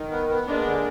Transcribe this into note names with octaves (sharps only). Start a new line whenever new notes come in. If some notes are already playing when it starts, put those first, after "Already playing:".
Already playing: D#3
B3
B3
G#3 A#3 D4
D3